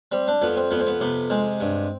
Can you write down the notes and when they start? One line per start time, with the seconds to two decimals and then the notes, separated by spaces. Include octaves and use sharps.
0.12 G3 C4
0.28 D4
0.42 F2 B3
0.56 C4
0.71 F2 B3
0.80 C4
0.86 B3
1.01 C3 B3
1.30 G#3 C4
1.60 G2